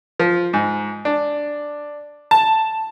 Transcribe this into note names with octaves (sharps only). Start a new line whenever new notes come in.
F3
G#2
D4
A5